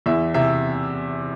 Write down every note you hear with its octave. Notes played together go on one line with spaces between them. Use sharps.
E2 E5
C3 E5